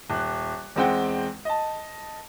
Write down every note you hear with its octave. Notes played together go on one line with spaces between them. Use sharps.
D#1 F#6
E2 G#3 C4 F#5 G5
D#5 A5